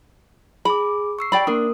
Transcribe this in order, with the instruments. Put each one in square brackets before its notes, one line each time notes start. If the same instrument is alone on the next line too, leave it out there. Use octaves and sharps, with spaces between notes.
[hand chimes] G#4 D6 [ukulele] B5
[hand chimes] C#6 E6 C7
[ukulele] G4 D5 B5
[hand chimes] A#3 A#4 D#6 [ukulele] D4